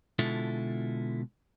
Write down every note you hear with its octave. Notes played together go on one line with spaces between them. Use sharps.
B2 D3 G#3 E4 F4 A4